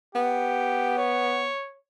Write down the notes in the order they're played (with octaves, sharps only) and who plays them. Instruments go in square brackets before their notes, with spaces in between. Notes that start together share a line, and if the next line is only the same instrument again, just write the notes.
[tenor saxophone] B3 [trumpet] G4
[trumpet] C#5